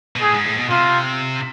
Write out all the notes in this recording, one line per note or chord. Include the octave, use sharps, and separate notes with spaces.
B2
A2 G#4
G#2
A2
B2
C3 F4